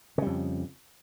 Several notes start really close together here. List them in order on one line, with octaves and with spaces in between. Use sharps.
C#3 G3 F2